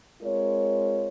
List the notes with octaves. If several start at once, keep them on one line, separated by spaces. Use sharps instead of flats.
G#3 C4 F4 A#4 C#5